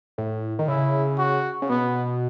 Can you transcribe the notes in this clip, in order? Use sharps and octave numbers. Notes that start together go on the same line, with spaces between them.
A2
D#3
C#3 E4
F#4
C#3
B2 B3